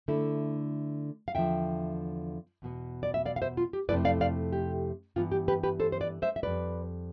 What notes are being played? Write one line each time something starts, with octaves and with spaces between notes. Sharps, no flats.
D3 A3 E4
F5
E2 D3 F3 E5 G5
E2 B2 B3
D5
E5
D5 F5
F5
C5 E5
F4
G4
F2 C3 F3 A3 E4 B4 D5
D5 F5
D5 F5
G4
G2 E3 B3 F4
G4
G4 B4
G4 B4
A4 C5
C5
B4 D5
C5 E5
E5
F2 C3 G3 B4 D5